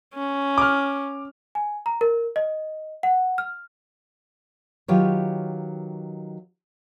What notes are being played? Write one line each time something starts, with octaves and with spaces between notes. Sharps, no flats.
C#4
D6 F6
G#5
A#5
A#4
D#5
F#5
F6
D#3 F#3 F4 G4 B4 C#5